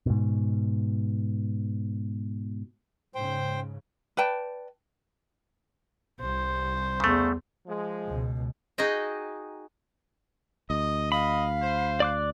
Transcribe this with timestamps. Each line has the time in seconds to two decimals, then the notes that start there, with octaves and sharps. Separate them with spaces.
0.06 G#2 B2
3.15 G#2 C#3 C5 G5
4.17 B4 D5 G5 A5
6.21 C2 C5
7.00 E2 C#3 A3
7.67 F3 G#3
8.07 C#2 B2
8.78 D#4 F#4 G#4 D#5 G5
10.70 D2 D#5
11.12 D#5 F5 B5
11.62 C5
12.00 D5 D6 F#6